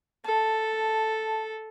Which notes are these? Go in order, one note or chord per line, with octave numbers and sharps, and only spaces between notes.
A4 A5